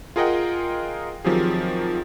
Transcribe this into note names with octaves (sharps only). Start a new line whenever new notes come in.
F4 G#4 A#4 D#5 F#5 G5
D#3 F3 F#3 C4 G4 G#4